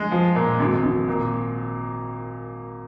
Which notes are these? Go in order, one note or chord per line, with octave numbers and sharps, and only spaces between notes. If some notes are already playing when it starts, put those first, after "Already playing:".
Already playing: G#3
F3
A#2
G#1
G#1
A#2